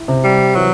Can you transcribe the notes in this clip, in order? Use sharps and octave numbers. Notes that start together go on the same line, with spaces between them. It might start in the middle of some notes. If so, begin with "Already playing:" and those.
Already playing: E4
C3
G3
E3 F#3